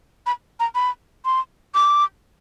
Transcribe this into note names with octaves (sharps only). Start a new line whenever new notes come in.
B5
A#5
B5
C6
D6